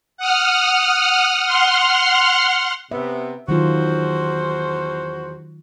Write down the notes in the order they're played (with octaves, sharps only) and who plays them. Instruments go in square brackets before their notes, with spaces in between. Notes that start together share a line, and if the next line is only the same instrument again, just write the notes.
[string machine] F#5 D#6 F6
F#5 C6 F6
[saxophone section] C3 B3 [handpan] E5
[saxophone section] E2 F#4 C5 [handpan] D#3 F#3 F4